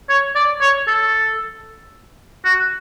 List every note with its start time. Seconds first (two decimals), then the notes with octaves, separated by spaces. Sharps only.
0.09 C#5
0.35 D5
0.61 C#5
0.88 A4
2.45 F#4